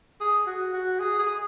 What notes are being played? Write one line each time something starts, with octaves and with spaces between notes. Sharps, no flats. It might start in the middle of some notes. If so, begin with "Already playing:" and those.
G#4
F#4
F#4
G#4
G#4